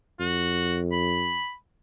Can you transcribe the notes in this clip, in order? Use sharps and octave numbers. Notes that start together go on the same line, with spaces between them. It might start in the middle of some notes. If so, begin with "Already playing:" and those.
F2 F#4
B5